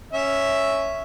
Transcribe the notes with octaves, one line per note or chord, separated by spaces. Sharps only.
C#4 E5